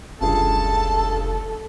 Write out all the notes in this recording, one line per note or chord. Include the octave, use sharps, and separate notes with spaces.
F1 C#2 G2 G#4 A4 A5